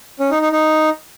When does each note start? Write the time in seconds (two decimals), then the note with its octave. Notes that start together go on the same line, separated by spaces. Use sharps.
0.20 C#4
0.31 D#4
0.42 D#4
0.52 D#4